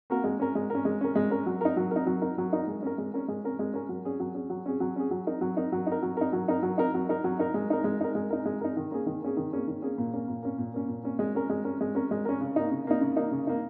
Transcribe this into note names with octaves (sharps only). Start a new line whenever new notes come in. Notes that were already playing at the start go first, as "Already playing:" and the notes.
A#3 F#4 A#4
G#3
C#4 A#4
G#3
C#4 A#4
G#3
C#4 A#4
G#3
C#4 A#4
F#3
D#4 A#4
F#3
D#4 A#4
F#3
D#4 A#4
F#3
D#4 A#4
G#3
C#4 A#4
G#3
C#4 A#4
G#3
C#4 A#4
G#3
C#4 A#4
F#3
C#4 G#4
F#3
C#4 G#4
F#3
C#4 G#4
F#3
C#4 G#4
F#3
D#4 A#4
F#3
D#4 A#4
F#3
D#4
A#4
F#3
D#4 A#4
F#3
D#4 A#4
F#3
D#4 A#4
F#3
D#4 A#4
F#3
D#4 A#4
G#3
D#4 A#4
G#3
D#4 A#4
G#3
D#4 A#4
G#3
D#4 A#4
D#3
A#3 C#4 G#4
D#3
A#3 C#4 G#4
D#3
A#3 C#4 G#4
D#3
A#3 C#4 G#4
A#2
A#3 C#4
A#2
A#3 C#4
A#2
A#3 C#4
A#2
A#3 C#4
G#3
C#4 A#4
G#3
C#4 A#4
G#3
C#4 A#4
G#3
C#4 A#4
C#3
A#3 D#4
C#3
A#3 D#4
C#3
A#3 D#4
C#3
A#3 D#4